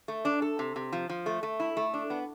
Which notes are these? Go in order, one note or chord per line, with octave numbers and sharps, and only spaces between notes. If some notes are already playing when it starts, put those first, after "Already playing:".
A3
D4
A4
C3
C3
F3
F3
A3
A3
E4
A3
D4
B3